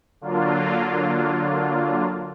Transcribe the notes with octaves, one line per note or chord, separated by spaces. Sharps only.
D3 F#3 A#3 D4 F4